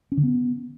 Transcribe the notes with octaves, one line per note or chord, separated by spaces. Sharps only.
C#4
D3
B3